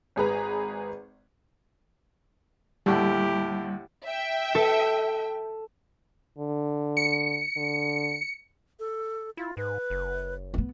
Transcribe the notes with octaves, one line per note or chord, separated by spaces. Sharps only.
G#1 G#4 B4 A#5
D#2 A2 D3 G3 E4 G4
E5 G5
A4
D3
C#7
D3
A4
E4 F4
G#2 B4
F#1
A#3 B3